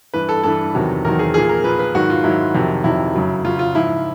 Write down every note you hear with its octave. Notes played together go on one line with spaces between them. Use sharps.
G2 E3 B4
A4
G2 E3 A4
E2 C3 D#3 F#3
E2 C3 D#3 F#3 A#4
G#4
A#2 F3 G#4
A#4
A#2 F3 B4
B4
G#2 D#3 F#3 F#4
F4
G#2 D#3 F#3 E4
F2 C3 D#3 F#3
F2 C3 D#3 F#3 E4
F#2 C#3 F#3
F#2 C#3 F#3 F4
F4
G#2 F3 E4